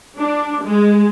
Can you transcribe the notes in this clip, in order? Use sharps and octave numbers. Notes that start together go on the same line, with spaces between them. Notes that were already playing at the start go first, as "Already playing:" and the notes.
D4
G#3